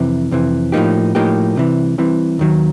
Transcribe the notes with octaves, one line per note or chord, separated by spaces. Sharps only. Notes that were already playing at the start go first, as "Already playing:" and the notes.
Already playing: F2 C3 E3
F2 C3 E3
A2 F3 A#3 D#4 G4
A2 F3 A#3 D#4 G4
C2 C3 E3
C2 C3 E3
D#2 D#3 F#3